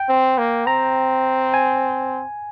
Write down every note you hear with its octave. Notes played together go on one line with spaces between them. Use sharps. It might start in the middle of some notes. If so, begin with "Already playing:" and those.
Already playing: G5
C4
A#3
C4 A#5
G#5